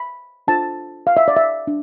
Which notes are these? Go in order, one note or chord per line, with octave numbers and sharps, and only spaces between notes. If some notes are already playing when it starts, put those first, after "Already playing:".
Already playing: B5
D4 F4 A4 C5 A5
F5
E5
D5
E5
D4